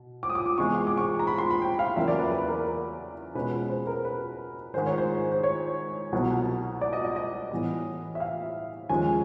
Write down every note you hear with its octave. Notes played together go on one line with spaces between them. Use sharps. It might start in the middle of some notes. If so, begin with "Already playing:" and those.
Already playing: B2
D6
D#6
D6
D6
C3 E3 G#3 B3 C#6
C#6
D6
C#6
A#5
B5
C6
B5
G5
F5
E2 C#3 F#3 A#3 E5
D5
B4
B4
A#4
A#4
B2 G#3 C#4 B4
C5
B4
A#4
B4
G#2 D#3 G#3 C5
C#5
C5
C5
C#5
C2 B2 F#3 B3
D5
D#5
D#5
D#5
A2 E3 G3 B3
E5
F5
D#2 C#3 F3 G#3 G#5